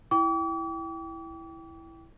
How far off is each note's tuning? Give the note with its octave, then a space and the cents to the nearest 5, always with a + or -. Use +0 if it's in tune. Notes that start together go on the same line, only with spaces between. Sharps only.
E4 +0 G5 +0 D6 -40